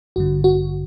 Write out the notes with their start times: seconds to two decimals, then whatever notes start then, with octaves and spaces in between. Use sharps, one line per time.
0.16 A1 G2 D3 F#4
0.44 F#4